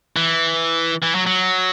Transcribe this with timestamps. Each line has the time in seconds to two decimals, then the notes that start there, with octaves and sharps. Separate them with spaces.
0.16 E3
1.03 E3
1.15 F#3
1.27 F#3